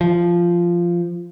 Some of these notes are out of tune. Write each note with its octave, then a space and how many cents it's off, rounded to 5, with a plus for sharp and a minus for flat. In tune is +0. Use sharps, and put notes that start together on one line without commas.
F3 -10